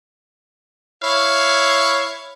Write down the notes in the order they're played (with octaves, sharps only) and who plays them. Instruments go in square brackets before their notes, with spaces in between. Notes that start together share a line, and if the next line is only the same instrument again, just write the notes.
[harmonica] E4 C#5 [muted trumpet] F5